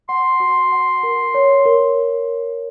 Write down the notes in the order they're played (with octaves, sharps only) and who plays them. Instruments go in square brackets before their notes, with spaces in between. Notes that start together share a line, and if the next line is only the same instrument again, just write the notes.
[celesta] F#5 [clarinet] C6
[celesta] F#4
F#5
A#4
C#5
A#4